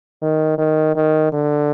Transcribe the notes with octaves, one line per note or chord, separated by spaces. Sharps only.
D#3
D#3
D#3
D3